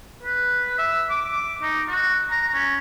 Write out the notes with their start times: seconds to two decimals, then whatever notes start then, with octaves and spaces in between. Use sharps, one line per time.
0.23 B4
0.78 E5
1.10 D6
1.62 D#4
1.88 F#4
2.30 A#5
2.54 C#4